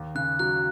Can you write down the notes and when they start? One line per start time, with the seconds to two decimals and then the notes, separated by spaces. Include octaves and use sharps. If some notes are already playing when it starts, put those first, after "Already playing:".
Already playing: D#2
0.15 C#3 F#6
0.39 F#3 F#6